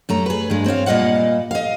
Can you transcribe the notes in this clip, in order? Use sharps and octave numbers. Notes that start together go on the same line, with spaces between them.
F#2 A3 A#5
G#4 B4
G2 G#3
C4 C#5 D#5 F5
A#2 G3 D#5 F5 F#5
D#5 F5